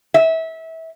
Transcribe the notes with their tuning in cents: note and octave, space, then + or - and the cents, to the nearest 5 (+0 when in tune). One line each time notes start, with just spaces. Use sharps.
E5 -25